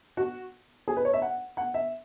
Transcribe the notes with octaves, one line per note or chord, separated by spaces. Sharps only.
F#4
G#4
B4
C#5
E5
F#5
F#5
E5